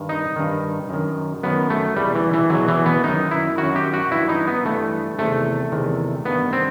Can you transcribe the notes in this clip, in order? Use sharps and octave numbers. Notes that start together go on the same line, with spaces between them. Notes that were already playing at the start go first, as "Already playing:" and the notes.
Already playing: G2 D#3
D#4
G2 D#3
F#2 D#3
F#2 D#3 B3
A3
E2 B2 G3
E3
E3
E2 B2 F#3
E3
B3
F#2 D#3 D#4
E4
F#2 D#3 F#4
G4
F#4
G2 E3 E4
D#4
B3
G2 E3 A3
E2 C3 D#3 A3
E2 C3 D#3
G2 D#3 B3
C4